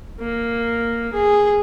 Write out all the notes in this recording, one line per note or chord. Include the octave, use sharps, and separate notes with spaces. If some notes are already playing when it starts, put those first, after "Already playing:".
A#3
G#4